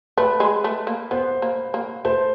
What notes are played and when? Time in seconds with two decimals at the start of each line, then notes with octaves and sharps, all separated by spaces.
0.17 A3 B4
0.40 G#3
0.64 A3
0.87 A#3
1.11 B3 C5
1.42 A#3
1.74 A#3
2.05 A3 C5